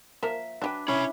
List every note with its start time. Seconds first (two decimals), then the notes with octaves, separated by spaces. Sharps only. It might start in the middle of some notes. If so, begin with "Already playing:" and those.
0.23 F3 A#3 A#4 E5
0.62 F#3 D4 G4 B4 G5
0.88 C#4 E4 C#5 B5